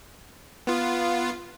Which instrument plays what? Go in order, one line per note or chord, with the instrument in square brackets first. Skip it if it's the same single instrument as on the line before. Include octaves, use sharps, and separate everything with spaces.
[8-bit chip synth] B3 F4